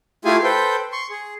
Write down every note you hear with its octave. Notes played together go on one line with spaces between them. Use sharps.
A3 E4 F4 G4 G#4 G#5
A4 B4 C5 G5
C6 C#6
G#4